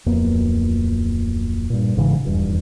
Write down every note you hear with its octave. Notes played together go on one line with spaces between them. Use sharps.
D1 F2 A#3 B3
G2 A#2
G#1 G#2 C#3 E3
D#1 E2 G2